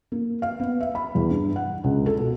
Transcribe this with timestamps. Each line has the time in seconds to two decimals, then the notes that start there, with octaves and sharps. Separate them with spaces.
0.12 A#3
0.42 F5
0.60 B3
0.80 E5
0.95 B5
1.15 E2
1.30 G2
1.56 F#5
1.84 C#2
2.06 A4
2.18 B2